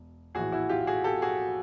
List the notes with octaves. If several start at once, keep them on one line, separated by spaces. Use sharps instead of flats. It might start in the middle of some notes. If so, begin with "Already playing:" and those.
Already playing: E1
A#1 A2 E3 F#4 G#4
E4 F#4
F4 G4
F#4 G#4
G4 A4
F#4 G#4